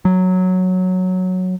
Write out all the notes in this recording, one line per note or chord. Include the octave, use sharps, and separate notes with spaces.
F#3